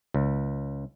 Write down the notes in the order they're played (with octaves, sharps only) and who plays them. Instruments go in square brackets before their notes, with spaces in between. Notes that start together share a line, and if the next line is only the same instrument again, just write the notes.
[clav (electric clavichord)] C#2